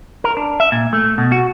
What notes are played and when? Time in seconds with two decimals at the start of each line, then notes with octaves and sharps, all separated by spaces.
0.24 A#4
0.37 D4
0.60 E5
0.72 A#2
0.93 A3
1.18 B2
1.32 F#4